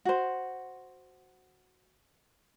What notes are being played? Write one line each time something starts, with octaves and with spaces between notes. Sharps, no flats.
F#4 C5